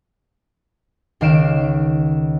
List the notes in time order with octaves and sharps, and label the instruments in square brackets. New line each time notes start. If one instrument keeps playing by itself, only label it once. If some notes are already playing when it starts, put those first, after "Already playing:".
[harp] C#2 D#3 F5 D7 E7